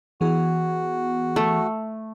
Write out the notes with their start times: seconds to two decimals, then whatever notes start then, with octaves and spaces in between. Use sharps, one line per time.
0.21 E3 B3 F#4 G#4
1.36 A3